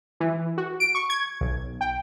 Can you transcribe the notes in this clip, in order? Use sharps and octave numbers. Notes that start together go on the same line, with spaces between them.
E3
F#4
D7
C#6
G#6
B1
G5